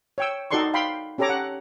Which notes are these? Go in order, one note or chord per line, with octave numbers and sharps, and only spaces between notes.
C#5 G5 E6
D#4 F#4 A4 D5 C6 C#6
F5 G5 B5 C6
C#4 G4 A4 C#5 A#5 D6
F#5